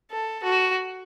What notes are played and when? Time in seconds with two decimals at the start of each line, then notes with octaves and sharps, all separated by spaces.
0.11 A4
0.43 F#4